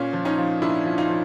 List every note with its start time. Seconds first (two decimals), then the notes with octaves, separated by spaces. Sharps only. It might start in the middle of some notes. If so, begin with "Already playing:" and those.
Already playing: A#2 C#4
0.13 F3
0.25 C#4 D#4
0.38 F3
0.62 A#2 D4 E4
0.85 F3
0.98 D#4 F4
1.09 F3